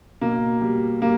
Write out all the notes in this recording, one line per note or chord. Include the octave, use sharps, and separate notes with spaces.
B2 A#3
G3
G3 A#3